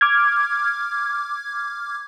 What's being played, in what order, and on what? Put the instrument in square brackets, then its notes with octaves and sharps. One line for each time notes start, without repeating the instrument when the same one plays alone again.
[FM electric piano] D6 F6 G#6